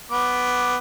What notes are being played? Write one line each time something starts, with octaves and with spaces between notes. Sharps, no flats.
B3 D6